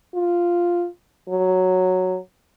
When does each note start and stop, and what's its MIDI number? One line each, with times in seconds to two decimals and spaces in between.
0.14 0.87 65
1.29 2.18 54